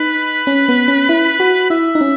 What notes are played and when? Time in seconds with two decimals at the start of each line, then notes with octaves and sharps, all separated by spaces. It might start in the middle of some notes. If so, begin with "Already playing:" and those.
Already playing: D#4 B4
0.47 C#4
0.68 B3
0.88 C#4
1.09 E4
1.40 F#4
1.70 E4 E5
1.95 D#4
2.01 C#4